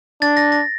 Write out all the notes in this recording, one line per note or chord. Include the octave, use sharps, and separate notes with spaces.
D4 A6
A#6
A#6